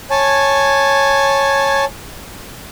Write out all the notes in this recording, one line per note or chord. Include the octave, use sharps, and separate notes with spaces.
C#5 G#5 A5